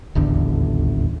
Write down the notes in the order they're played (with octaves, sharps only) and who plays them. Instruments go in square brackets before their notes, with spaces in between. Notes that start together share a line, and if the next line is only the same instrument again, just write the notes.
[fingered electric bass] D#1 A1 E2 D3